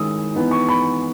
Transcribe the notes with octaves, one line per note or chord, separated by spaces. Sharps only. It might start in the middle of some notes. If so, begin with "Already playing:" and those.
Already playing: D#3 G#3 C#4 E4 D#6 E6
E3 B3 D#4
C#6
B5